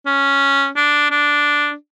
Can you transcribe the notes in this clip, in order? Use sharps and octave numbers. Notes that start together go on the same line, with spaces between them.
C#4
D4
D4